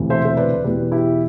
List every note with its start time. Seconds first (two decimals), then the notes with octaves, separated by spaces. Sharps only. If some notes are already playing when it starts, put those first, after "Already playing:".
Already playing: E1 D2 C3 E3
0.10 C5 E5
0.25 C5
0.37 B4 D5
0.64 E1 E2 B2 G4 B4
0.92 E4 G4